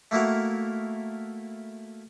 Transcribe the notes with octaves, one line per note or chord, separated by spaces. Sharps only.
A3 A#3 E4 F#4 A#4